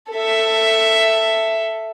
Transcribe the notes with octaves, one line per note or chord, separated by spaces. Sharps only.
A4 E5